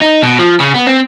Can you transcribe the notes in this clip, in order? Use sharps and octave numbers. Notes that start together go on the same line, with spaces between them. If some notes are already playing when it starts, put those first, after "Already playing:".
D#4
B2
F3
C#3
B3
C4